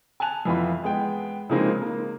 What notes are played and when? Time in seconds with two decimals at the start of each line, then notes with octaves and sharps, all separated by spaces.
0.20 G#5 A5 F#6 F7
0.45 F2 E3 B3 F4 B5
0.84 G#3 B3 G5
1.50 C#3 F3 G#3 A#3 C4 D#4
1.82 A#3